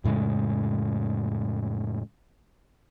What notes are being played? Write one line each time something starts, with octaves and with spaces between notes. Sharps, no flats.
F2 A2 C#3 G#3